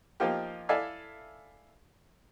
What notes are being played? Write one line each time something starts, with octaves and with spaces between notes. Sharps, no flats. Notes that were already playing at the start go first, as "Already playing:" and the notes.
F3 A#3 D#4 F4 G4
E4 A4 D5 E5 F5 G#5